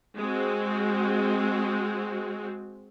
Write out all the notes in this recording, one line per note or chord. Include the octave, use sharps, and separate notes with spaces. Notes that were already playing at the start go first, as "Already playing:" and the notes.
G#3 C4 F#4